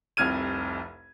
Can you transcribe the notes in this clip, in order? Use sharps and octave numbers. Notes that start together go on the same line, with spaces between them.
F1 C2 F2 F6 G#6 D#7